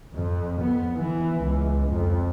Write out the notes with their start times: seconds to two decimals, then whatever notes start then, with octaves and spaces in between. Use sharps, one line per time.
0.12 F2
0.61 B3
0.96 E3
1.42 C#2
1.92 F2